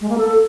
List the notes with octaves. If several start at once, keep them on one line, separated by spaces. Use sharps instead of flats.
G#3
A#3
A4